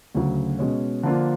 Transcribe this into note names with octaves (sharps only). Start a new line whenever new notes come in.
D2 C#3 F#3
B2 G#3 C#4
D3 F3 A#3 D4 F4